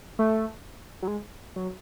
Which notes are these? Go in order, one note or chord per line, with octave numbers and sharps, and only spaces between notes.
A3
F#3
G#3
F#3